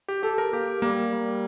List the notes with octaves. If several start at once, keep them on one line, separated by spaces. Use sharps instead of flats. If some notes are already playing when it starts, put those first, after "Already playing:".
G4
G4 A4
A#4
A#3 G4
G3 A#3
G3